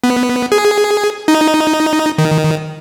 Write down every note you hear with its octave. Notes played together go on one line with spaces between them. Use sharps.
B3
G#4
D#4
D#3